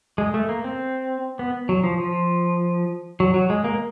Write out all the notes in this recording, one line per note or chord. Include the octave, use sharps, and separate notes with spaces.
G#3
A3
A#3
C4
B3
F#3
F3
F3
F#3
F#3
G#3
A#3